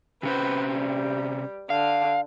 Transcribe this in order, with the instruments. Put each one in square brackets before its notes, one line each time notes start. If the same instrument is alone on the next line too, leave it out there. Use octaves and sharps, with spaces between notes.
[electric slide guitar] C3 C#4 C5 [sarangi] B4
[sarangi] G3
[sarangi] D3 [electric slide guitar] F5